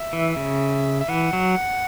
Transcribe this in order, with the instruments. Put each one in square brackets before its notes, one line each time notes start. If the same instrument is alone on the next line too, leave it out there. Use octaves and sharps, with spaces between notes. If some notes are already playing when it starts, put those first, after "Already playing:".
Already playing: [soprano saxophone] E5
[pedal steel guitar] E3
C#3
[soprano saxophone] E5
[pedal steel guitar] E3 [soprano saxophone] F#5
[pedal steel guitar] F#3